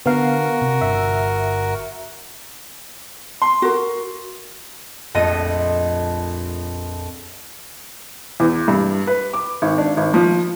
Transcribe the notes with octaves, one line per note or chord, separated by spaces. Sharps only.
D3 B3 F#4 A#4 F5
C3
G1 E5
C6
F#4 A#4
A#1 F2 A3 D#5 D#7
E2
G2
B4
D6
G#1
D4
G#1
F3